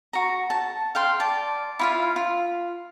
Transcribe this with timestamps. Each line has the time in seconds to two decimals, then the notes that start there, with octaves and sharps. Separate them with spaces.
0.13 F#4 A#5
0.50 A5
0.95 F5 G5 C6
1.20 D5 A5
1.79 E4 F4 F5
2.16 F4